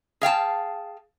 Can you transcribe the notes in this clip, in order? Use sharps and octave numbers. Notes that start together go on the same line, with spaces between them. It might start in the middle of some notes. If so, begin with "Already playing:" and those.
G#4 F5 G5 A5